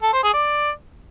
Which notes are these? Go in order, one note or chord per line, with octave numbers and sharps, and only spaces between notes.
A4
C5
G#4
D5